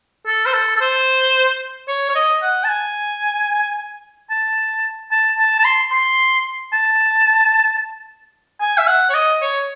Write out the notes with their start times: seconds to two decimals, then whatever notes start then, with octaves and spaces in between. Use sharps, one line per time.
0.26 A4
0.46 C5
0.53 A4
0.76 A4
0.80 C5
1.88 C#5
2.09 C#5
2.15 D#5
2.42 F#5
2.64 A5
2.69 G#5
4.30 A5
5.11 A5
5.37 A5
5.59 A5
5.64 C6
5.91 C6
6.73 A5
8.60 G#5
8.78 E5
8.87 F#5
9.10 C#5
9.14 D#5
9.41 C#5